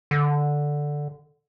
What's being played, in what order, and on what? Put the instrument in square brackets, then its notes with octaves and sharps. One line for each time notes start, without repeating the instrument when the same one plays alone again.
[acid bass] D3